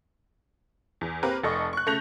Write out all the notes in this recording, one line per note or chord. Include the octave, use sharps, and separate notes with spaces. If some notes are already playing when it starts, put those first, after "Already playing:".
E2
A#3 C4 G4 A#4 B4
F1 A4 D#5 C#6
C#6 F#6
C#3 A3 C#6 G6 A#6 F7